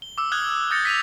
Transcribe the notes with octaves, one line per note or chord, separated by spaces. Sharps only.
G7
D6 E6
D#6 F6 F#6 G#6 G7
D#6 G6 A6 A#6 C#7
B6 D#7 F7